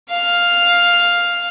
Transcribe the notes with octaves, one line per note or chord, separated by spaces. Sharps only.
F5